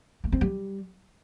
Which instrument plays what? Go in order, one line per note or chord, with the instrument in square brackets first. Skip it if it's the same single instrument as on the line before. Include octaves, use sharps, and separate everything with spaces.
[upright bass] A3
C4
G3